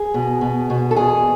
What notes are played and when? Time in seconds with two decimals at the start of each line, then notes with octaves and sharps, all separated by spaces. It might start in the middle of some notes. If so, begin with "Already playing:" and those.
Already playing: G#4
0.14 B2
0.41 B2
0.70 B2
0.91 A4
0.97 E2 G#4